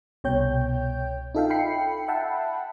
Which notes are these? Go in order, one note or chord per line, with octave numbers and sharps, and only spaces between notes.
C2 B2 C#5 G5 G6
D#4 F4 A4 E5 F5 G5
G5 B5 C7 C#7
E5 F#5 G5 A5 B5